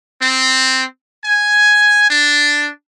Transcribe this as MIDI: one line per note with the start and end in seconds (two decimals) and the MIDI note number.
0.21 0.83 60
1.24 2.06 80
2.09 2.69 62